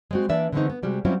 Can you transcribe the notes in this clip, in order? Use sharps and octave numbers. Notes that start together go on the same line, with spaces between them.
G#3 C4 F#4
E3 A#3 D4 D5 E5
D3 E3 G#3 A3 C4 D#4
B3
C3 G3 G#3 F#4
F#3 G3 C4 C#4 E4 F4